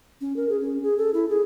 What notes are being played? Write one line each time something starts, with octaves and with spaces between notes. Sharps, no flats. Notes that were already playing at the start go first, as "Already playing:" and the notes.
C#4
A#4
G#4
C#4
G#4
A4
E4
G#4